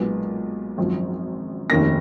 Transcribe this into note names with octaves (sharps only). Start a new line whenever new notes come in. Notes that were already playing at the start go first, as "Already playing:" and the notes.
Already playing: B1 A#2 G#3 B3
G#1 F#2 F3
F1 D#2 D#3 A#3 C#4 A#6